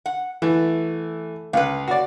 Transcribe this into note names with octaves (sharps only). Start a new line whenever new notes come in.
F#5
E3 A3
C#2 B4 F5
F#4 D5